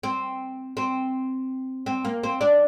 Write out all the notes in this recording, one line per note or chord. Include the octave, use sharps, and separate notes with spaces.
C4
C4
C4
A#3
C4
D4